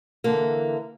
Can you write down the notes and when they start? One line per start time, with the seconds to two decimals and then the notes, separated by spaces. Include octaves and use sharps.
0.24 D3 E3 A#3